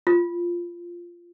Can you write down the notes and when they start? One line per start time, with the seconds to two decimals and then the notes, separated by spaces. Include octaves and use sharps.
0.07 F4